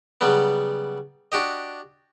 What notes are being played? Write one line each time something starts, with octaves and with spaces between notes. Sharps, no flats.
C#3 F#3 G3 B3
D4 F#4 G4 D#5